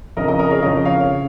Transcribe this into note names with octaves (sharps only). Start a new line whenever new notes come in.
F2 C#3 A#4 D#5
A#4 D#5
A#4 D#5
G#4 C#5
F2 C#3 A#4 D#5
C#5 F5
C#3